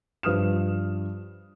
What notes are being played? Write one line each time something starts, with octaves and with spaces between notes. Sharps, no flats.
G2 F3 B4 D#6 F6 E7